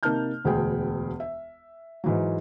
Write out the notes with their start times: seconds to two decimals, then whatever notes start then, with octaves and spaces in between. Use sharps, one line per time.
0.03 C3 A#3 D#4 A5 F6 G6
0.44 E1 D2 B3 G#4 G5
1.20 E5
2.04 G#2 E3 F#3